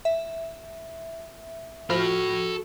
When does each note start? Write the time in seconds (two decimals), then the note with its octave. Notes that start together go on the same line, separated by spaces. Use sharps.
0.05 E5
1.90 F3 F#4 A4 B5 F6